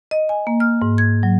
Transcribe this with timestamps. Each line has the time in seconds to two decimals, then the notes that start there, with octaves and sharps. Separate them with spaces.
0.11 D#5
0.29 G#5
0.47 A#3
0.60 F6
0.82 G#2
0.98 G#6
1.23 F#3